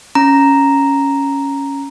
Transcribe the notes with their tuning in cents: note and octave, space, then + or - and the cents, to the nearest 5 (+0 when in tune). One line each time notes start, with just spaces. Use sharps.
C#4 +0 A#5 +0